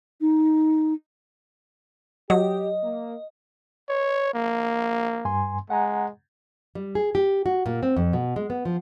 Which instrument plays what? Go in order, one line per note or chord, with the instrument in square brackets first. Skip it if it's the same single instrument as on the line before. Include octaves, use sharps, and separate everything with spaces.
[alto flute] D#4
[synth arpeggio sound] F#3 [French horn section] G4 [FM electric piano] D#5
[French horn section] A#3
[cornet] C#5
A#3
[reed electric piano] G2 G#5 C6
[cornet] G#3 [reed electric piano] F#5 G#5 A#5
[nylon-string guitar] G3
G#4
G4
F#4
A#2
C4
F2
B2
G#3
B3
F3